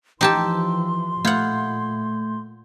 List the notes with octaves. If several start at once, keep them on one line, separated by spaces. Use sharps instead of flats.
E3 F3 D#4 G4 G5 A5 C6 E6
A#2 A3 F4 F#5 G6 G#6